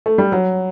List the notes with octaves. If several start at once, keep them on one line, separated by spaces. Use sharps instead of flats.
A3
G3
F#3